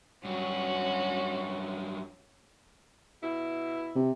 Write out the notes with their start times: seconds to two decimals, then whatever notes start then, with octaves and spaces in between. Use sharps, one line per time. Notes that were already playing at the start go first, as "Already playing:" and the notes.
0.25 G2 F#3 C#4 F#4
3.22 B2 E4
3.96 C3